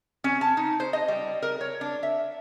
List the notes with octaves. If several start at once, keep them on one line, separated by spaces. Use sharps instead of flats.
C#4
A5
D#4
C5
D#5
G3
A#4
C#5
D4
E5